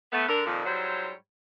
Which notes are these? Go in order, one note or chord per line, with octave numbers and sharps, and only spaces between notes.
A3 B3
D3 A#4
F2 A#2 D#3
G#2 F#3 G3 E4 C5 C#5